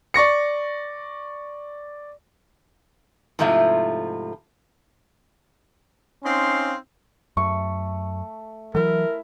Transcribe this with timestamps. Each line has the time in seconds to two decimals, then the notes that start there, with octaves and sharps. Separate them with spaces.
0.14 D5 C#6 A#6 C#7
3.39 G#2 C3 F3 A3 E4 F4
6.24 C4 C#4 D#4 F5 C6
7.37 F#2 A3 C#6
8.75 E3 F#3 E4 A#4 E5